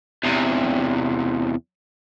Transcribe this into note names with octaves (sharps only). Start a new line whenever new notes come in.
E2 C3